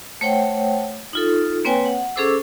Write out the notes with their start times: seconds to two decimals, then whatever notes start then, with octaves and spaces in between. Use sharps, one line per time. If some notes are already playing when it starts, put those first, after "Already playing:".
0.21 A3 C5 C#5 F#5 G5
1.13 D#4 F4 A4
1.65 A#3 C4 B4 C#5 G5 G#5
1.86 F#5
2.16 C#4 G#4 A4 C5 D6 E6